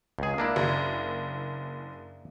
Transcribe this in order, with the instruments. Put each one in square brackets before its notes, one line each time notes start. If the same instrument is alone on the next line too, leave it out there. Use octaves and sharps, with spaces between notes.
[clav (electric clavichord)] C#2 G#4
A#3 D4 E4
[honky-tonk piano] F#1